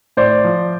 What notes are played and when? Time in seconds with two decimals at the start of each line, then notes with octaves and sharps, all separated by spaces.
0.17 A2 C5 D5
0.44 F3